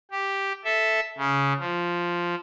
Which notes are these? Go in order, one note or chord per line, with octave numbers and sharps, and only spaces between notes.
G4
A4 E5
C#3
F3